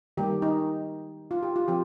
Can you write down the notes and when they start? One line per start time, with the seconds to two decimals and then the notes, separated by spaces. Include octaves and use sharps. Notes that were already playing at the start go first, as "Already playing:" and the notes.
0.17 D#3 G3 A#3 G4
0.42 D#4
1.31 F4
1.43 G4
1.56 F4
1.68 F3 C4 G4